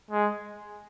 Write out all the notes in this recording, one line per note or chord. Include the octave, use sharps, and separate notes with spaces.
G#3